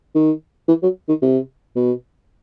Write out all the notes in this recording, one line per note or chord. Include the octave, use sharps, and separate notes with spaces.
D#3
E3
F#3
D#3
C3
B2